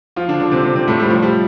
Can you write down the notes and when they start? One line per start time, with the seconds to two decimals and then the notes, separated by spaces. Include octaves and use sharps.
0.16 F3 F4
0.28 D3 D4
0.40 D3 D4
0.51 C3 C4
0.63 C3 C4
0.75 C3 C4
0.87 A2 A3
1.00 G3
1.10 F3
1.23 G3